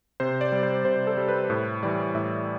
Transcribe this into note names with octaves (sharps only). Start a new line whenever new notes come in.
C3 C5
D5
G3
C5
C3 C5
A4
G3
B4
A2
E3 G3 D5
A2 E5